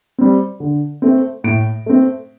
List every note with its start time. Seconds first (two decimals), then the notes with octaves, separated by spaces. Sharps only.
0.18 G3 C4
0.60 D3
1.02 A3 C4
1.44 A2 D7
1.86 A3 C4